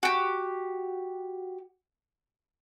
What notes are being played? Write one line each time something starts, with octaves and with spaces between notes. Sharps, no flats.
F#4 G4